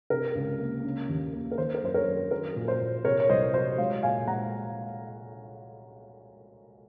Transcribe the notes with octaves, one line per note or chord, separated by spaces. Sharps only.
C3 A#4
C#2
A#3
C#3
D#2
A#3
A#4
D#3 C5
A#4
F#2 C5
A#4 C#5
F#2
F#3 A#4
A#2
C5
A#2
C3 A#4 C#5
C#5
C2 C5 D#5
F#3 C5 D#5
G#3 C#5 F5
A#2 F5 G#5
G#3 F#5 A#5